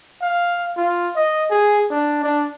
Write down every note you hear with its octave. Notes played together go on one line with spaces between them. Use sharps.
F5
F4
D#5
G#4
D4
D4